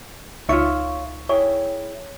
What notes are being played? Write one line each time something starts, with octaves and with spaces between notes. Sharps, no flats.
C#2 D#4 F4 C#5 E5 C#6
E4 G#4 C#5 G5